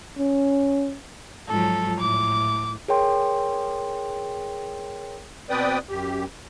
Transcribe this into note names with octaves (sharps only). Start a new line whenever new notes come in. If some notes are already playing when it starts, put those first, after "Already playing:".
C#4
G#2 F3 F#3 A4
A2 D6
G#4 A#4 C#5 G5 C6
B2 C4 B4 D5 G5 D#6
F#2 G4